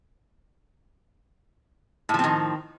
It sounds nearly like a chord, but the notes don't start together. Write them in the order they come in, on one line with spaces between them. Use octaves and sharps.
A2 F3 C4 D#3